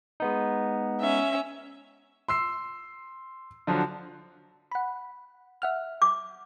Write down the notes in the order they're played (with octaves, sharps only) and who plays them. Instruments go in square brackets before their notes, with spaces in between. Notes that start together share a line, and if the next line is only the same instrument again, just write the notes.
[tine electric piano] G#3 B3 D#4
[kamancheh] C#4 E5
[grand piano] C6 E6 C7
D3 F3 F#3
[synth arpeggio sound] F#5 B5
E5 F#5 F6
[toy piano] D6